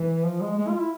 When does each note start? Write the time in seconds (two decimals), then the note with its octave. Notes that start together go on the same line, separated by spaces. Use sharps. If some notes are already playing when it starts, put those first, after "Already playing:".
Already playing: E3
0.24 F3
0.41 G#3
0.57 G#3
0.68 F4
0.79 E4